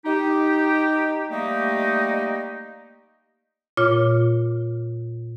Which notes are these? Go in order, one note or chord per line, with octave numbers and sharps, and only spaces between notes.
D#4 G4
G3 A3 A#3 D#4 G4 D#5
A#2 F4 C#5 D6 F6